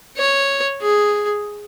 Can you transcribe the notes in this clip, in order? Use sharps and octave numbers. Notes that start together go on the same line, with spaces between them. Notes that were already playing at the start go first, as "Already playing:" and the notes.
C#5
G#4